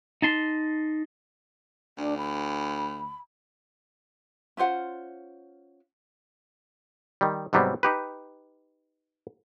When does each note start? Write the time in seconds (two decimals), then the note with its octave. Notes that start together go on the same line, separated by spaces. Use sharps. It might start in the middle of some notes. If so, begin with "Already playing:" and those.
0.22 D#4 A5 C6
1.98 D2 D4
2.18 B5
4.57 C#4 F4 C5 F#5
7.21 D#3 G3
7.53 G#2 C3 F#3 G3 B3 C4
7.83 D#4 G4 B4